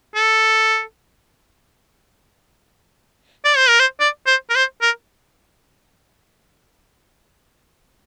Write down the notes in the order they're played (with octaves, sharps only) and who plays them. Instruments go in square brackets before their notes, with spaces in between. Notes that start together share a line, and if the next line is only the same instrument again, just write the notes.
[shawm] A4
D5
C5
A#4
C5
D5
C5
A#4
C5
A#4